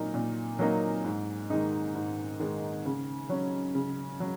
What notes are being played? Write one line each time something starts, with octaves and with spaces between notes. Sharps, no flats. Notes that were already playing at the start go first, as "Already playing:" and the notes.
Already playing: A#2 F#3 A#3 D#4
A#2
F#3 A#3 D#4
G#2
D#3 G#3 D#4
G#2
D#3 G#3 D#4
C#3
F#3 C#4
C#3
F#3